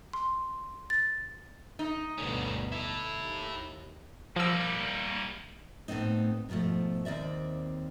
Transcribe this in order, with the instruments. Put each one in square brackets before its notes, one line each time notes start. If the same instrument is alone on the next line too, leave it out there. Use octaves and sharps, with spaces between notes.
[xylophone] C6
A6
[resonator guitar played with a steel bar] D#4
[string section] D2 G2 B2 [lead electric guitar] D3 C#4
[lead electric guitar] E4 A4
[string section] D#2
[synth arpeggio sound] F3 E6 [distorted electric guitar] G3 A#3
[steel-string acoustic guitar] A2 A3 B3 C4 D#4
G#2 B2 D#3 F3 A3
D#2 C4 D5 E5